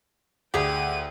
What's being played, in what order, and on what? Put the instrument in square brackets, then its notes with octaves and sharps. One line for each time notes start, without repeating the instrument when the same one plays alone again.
[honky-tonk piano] D2 [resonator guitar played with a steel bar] G4 G#4 [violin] G5 D#7